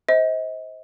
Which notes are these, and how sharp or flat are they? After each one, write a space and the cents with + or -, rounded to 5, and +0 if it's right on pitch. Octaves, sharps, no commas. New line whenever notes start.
C5 +0 D#5 +40